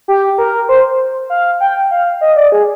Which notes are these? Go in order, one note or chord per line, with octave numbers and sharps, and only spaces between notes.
G4
A#4
C5
F5
G5
F5
D#5
D5
G#4